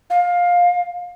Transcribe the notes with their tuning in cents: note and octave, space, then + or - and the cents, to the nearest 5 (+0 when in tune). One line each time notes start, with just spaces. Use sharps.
F5 +20